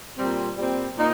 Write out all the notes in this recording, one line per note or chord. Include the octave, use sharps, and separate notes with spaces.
A#2 G3 C4
A#2 G3 C4
A#2 A#3 D#4